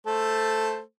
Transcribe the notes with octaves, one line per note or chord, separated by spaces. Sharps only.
A3 A4 C5